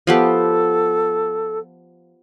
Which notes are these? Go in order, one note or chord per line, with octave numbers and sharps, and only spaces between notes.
F3 B3 G4 A4